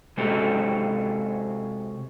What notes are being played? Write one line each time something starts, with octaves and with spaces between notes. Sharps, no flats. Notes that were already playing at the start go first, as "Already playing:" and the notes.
C3 G#3 F#4 G4 A4